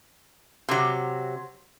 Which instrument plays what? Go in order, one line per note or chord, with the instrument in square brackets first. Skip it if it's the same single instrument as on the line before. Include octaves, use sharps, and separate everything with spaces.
[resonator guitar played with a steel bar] C3 F#3